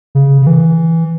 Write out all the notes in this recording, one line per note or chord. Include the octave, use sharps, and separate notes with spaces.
C#3
C#3
E3